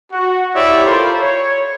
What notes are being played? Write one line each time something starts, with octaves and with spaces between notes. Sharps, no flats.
F#4
E4 G4 C#5 D5 E5
F4 A4 A#4 C5 B5
C#5